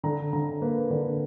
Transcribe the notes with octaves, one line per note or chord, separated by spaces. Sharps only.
D3 A#5
D3 A#5
A#3 B4
D3